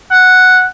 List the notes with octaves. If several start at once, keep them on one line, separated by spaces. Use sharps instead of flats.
F#5